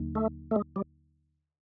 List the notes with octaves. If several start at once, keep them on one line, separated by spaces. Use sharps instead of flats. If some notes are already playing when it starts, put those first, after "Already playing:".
Already playing: D#2 D3 F#3 A#3 D#4
A3
A3
G#3
G3